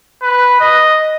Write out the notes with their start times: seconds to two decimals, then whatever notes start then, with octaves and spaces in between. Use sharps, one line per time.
0.23 B4
0.60 D#5